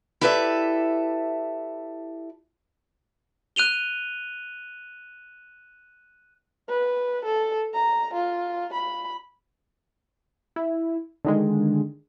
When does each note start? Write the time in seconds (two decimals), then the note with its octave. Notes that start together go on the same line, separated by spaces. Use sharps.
0.21 E4 G4 A4 B4 D5 E5
3.56 F#6 D#7 F7 G7
6.69 B4
7.25 A4
7.74 A#5
8.14 F4
8.73 B5
10.56 E4
11.25 D3 D#3 G#3